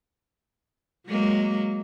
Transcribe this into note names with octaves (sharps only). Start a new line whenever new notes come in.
F#3 G#3 A#3